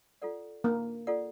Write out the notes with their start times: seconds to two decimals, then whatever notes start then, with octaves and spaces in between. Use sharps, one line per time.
0.22 F4 A4 D5 F#5
0.64 A#3 D4
1.07 F4 A4 D5 F#5